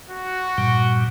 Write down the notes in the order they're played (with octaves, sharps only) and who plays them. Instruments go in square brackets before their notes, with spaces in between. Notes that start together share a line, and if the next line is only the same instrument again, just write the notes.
[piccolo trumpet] F#4
[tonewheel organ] G2 A#2 G3